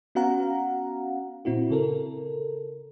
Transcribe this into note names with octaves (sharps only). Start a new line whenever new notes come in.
B3 C#4 F#4 F5 F#5 A#5
A#2 C4 E4 F#4
C#3 A4 A#4